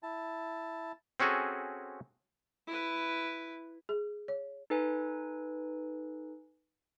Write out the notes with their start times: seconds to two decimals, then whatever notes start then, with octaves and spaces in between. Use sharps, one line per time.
0.03 E4 A5
1.20 C4 C#4 F#4 G#4 A4
2.67 E4 B4
3.89 G#4
4.28 C#5
4.70 D#4 A4 B4 G#5